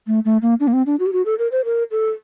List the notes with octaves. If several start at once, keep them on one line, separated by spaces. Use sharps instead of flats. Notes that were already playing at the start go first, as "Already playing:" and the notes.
A3
A3
A#3
D4
A#3
C4
D4
F#4
G4
F#4
A4
A#4
C5
A#4
A4